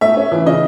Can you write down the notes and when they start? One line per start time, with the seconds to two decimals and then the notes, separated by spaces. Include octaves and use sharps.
0.01 A3 E5
0.17 C#4
0.32 E3
0.46 C#3 D#5